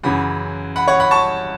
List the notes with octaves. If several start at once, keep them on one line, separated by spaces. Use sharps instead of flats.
F#2 C#3 E3 F#5 B5
F#5 B5
C#5 F#5
F#5 B5
A5 C#6